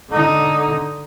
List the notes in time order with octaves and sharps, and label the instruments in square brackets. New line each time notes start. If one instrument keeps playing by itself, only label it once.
[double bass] D3 D#4